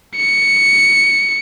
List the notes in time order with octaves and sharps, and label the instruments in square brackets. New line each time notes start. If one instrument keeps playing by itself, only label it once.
[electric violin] C#7